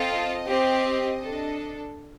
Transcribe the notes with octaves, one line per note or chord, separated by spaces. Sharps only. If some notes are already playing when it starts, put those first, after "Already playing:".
Already playing: C4 F4 A4 D#5
C4 G4
D4 A4